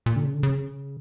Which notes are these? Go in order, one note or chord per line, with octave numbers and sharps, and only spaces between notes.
A#2
D3
C#3
D3
C#3